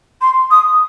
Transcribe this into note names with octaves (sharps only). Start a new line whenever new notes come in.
C6
D#6